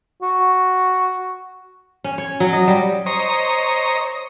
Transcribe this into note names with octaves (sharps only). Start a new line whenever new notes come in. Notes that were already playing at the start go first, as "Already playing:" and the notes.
F#4
C#4
C#5
F#3
D#5
G3
C5 C#5 D#5 A#5